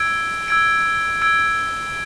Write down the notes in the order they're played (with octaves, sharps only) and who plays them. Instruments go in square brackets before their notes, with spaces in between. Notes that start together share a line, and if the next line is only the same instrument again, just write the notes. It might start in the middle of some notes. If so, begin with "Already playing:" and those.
Already playing: [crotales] E6 G#6 D7
E6 G#6 D7
E6 G#6 D7